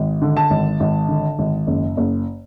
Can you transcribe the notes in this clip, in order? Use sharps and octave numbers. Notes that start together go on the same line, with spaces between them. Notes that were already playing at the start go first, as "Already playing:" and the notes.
Already playing: G#1
D3
A5
G#1
G#1
D3
G#1
F#1
F#1